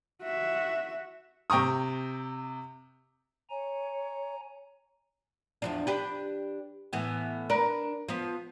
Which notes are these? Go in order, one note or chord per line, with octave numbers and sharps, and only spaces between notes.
F#4 E5
C3 G5 A#5 C#6 D#6
C#5 G#5 A#5
E2 F3 D4
D4 G4 B4
A2 E3 B3
D4 A#4 B4
F3 B3